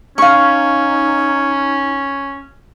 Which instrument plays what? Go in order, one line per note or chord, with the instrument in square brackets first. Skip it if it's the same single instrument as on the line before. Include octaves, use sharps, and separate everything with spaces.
[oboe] C#4 [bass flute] D#4 [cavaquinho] F5 C#6